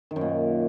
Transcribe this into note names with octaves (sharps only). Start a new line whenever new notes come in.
D#3
F#2
A#2